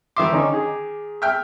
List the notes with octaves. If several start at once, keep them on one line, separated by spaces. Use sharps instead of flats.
D#3 E3 E5 C6 D6
D3 C#4 D#4
G#4
E5 G5 F6